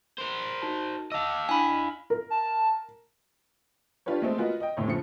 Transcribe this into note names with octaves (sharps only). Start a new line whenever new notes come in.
A#4 C5
D#4 F#4 A5
D#5 F5 A5 D6 E6
D4 E4 G#5 B5
A#4
A5
D4 F4 G4 B4 C#5
G#3 A3 C4
B3 F4 F#4 A#4 D#5
D#5 G5
F1 A2 C#5
C#3 F3 C#7